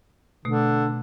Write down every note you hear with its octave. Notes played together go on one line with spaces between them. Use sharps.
B2 D3 A3